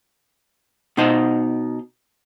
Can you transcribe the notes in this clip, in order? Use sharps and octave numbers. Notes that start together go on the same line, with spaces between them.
B2 D#4 C5 D#5 A5